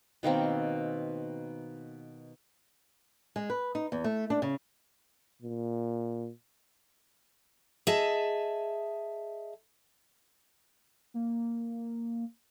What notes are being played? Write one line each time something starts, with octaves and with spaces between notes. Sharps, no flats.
B2 D#3 A#3 C4
G#3
B4
D#4
E2
A3
D4
C#3
A#2
G#4 D#5 E5 A5
A#3